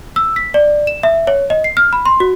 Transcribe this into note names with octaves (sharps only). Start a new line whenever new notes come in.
E6
B6
D5
E7
E5
C#5
D#5
C7
F6
B5
C6
F#4